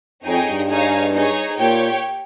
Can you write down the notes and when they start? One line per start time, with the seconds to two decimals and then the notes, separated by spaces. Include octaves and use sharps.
0.24 F2 D#4 G#4 C#5 G5
0.46 G2
0.68 D#4 G#4 C#5 F5 G#5
1.13 D#4 G#4 C#5
1.57 A#2 G4 C#5 G5